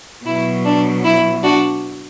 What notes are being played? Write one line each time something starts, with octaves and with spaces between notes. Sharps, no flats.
B2 F#3 E4
D4
E4
D4 F#4